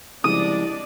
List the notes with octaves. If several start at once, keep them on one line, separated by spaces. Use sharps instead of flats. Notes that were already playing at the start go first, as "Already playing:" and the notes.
C2 C#3 F3 G#3 D4 D5 D#5 D#6